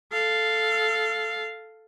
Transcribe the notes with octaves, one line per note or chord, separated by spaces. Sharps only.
A4 F5